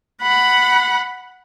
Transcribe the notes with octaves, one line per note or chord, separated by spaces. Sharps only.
F#5 B5